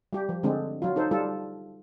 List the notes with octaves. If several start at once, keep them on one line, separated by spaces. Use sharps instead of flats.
G3 G4
F3
D3 G#3 C4 D4
F#3 F4
D#4 A4 C5
G3 F4 A4